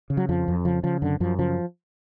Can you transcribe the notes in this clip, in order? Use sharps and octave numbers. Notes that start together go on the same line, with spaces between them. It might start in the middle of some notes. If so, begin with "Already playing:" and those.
C#3
F#3
F2 F3
F2
C#3 F3
C#3 F3
F#2 D3
F#2 F3
C#3 F3